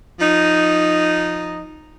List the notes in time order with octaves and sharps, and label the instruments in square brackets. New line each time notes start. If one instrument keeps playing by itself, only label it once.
[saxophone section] F3 D#4